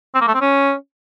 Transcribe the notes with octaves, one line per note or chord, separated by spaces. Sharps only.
C4
A#3
A3
C4
C#4